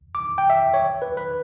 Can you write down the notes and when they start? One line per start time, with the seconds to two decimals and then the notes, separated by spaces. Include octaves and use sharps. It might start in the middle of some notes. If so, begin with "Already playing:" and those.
0.15 D6
0.38 G5
0.50 E5
0.74 C#5
1.02 B4
1.17 B4